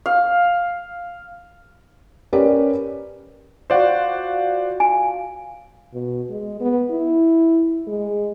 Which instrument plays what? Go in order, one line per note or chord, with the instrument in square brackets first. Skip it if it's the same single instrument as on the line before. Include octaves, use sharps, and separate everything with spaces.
[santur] F5
[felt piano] C#4 G4 A#4 B4 D5
[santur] F4 F#4 [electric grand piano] C5 D5 F#5
[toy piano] G#5
[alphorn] B2
G#3
B3
E4
G#3